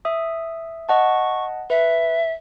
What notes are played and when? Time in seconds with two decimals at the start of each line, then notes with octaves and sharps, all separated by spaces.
0.05 E5 D#6
0.89 D#5 F#5 A5 C#6
1.70 B4 E5